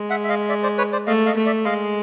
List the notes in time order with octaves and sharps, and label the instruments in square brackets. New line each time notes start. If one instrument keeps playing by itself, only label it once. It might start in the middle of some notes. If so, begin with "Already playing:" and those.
Already playing: [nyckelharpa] G#3
[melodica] E5 F#5
E5
D#5 F5
D5 E5
C5 D5
B4 C#5
C5 D5
[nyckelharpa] A3 [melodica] D#5 F5
[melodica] D#5 F5
[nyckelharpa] A3
[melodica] D5 E5
[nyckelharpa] G#3 [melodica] D#5 F5